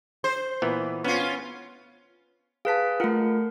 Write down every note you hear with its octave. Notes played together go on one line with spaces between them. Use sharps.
C5
A#2 E3 B3
B3 C#4 F4
G#4 B4 F5 A5 B6
A3 F4 A#4 F#5